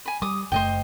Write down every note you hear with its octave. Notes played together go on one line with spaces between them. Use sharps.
G#5 B5
G3 D6 D#6
F#1 B2 A3 C5 D#5 G5